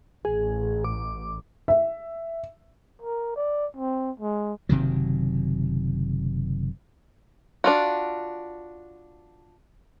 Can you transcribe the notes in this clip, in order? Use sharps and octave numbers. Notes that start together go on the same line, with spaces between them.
A1 G#4
D6
E5
A#4
D5
C4
G#3
F#1 C3 D#3 F#3
D4 F4 F#4